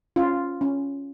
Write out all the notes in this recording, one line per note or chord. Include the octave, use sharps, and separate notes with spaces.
C#4 F4
C#4